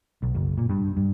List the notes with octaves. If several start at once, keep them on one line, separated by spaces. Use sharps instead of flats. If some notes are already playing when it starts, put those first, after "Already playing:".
B1
F#1
A#2
G2
G2